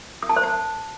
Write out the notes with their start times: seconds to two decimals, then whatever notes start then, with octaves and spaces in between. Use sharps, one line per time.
0.22 D#6
0.29 A5
0.36 C5
0.43 A5